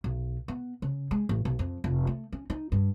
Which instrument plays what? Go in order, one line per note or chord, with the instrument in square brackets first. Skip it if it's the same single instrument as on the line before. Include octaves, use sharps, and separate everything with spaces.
[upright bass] B1
B3
C#3
G#3
A1
B1
F2
F1
A3
C#4
D#4
G2